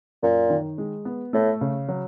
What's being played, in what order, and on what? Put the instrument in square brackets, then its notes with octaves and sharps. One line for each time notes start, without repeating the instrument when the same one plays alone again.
[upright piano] F#2 [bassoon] A#2
[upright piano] D#3
G#3
B3
[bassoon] A2 [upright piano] A3
[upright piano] C#3
F#3